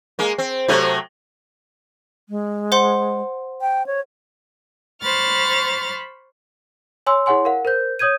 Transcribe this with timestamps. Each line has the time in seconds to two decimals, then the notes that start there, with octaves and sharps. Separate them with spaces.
0.19 G#3 A#3
0.38 C4
0.68 C3 F#3 A3
2.29 G#3
2.72 C5 F#5 C6
3.61 G5
3.86 C#5
5.02 C5 B5 C#6 F6 A6
7.06 C#5 G#5 C6 E6
7.26 E4 G#4 C#5 F#5 G#5 C6
7.45 A#4 F5 F#5
7.65 A#4 C5 G6
7.99 C#5 D#6 G6 G#6 D#7